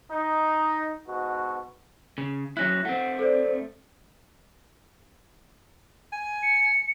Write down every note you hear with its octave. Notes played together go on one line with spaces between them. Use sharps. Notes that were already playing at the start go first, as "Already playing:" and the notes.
D#4
G#2 B2 F#4
C#3
F#3 C#4 E4 F#6 A#6
A3 C4 F#5
A4 C5 D5
G#5
C#7